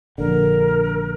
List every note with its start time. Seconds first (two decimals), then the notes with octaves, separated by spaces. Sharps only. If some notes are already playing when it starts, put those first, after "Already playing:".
0.18 A#1 D3 A#4